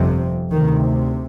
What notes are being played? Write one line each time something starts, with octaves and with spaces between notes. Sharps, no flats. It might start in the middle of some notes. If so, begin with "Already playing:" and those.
Already playing: G1 F2 C3
D2 C3 D#3